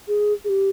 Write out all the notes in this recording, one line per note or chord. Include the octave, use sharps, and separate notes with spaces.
G#4
G#4
G4